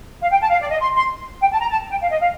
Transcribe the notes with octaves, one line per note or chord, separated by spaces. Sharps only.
F5
G5
A5
F5
D5
D#5
C6
C6
G5
A5
A#5
A5
G5
F5
D#5
F5